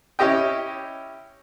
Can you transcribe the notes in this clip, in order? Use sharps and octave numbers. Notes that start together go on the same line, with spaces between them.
C#4 E4 G4 D#5 G5